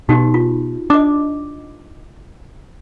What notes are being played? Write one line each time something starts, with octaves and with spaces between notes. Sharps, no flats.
B2 D#4 F#4 G4
F4
D4 D#5 D6